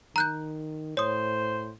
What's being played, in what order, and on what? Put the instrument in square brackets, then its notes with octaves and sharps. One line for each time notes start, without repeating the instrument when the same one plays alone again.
[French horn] D#3 [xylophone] A#5 F#6 G6
[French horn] A2 [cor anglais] C5 [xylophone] C#5 D#6